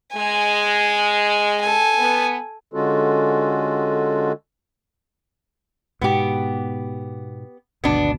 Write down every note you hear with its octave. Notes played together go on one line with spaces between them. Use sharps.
G#3 G#5
A4 G#5
B3
D3 G#3 C#4 F4 F#4 A4
G#2 B2 B3 G4
G#1 D2 B2 B3 D4